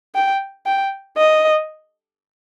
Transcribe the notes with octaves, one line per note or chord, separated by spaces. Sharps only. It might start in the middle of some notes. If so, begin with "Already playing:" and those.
G5
G5
D#5